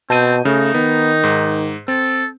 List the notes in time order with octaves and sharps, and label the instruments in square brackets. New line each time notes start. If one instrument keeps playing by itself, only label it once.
[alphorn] B2 [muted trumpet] C4 [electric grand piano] A5 G6 D#7
[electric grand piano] C#3 [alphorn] A3 [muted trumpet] D#4
[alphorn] D#3 [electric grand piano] B3
[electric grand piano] G#2
[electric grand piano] C4 [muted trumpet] A4